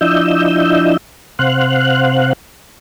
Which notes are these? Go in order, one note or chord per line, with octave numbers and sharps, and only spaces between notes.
F3 D4 E4 D#5 E6 G6
C3 C5 F5 F#5 F#6